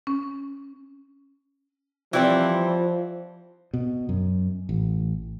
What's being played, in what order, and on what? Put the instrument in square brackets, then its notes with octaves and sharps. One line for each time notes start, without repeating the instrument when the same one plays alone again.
[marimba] C#4
[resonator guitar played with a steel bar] E3 G3 C4 [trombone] F3
[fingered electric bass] B2
F#2
A1